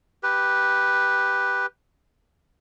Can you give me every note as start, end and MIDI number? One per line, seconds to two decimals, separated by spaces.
0.23 1.66 67
0.23 1.66 71